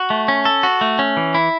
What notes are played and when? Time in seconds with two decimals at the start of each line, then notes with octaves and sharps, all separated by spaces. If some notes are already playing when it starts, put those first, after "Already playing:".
Already playing: F#4
0.10 A3
0.28 C#4
0.45 A4
0.63 F#4
0.81 A3
0.99 C#4
1.17 E3
1.34 E4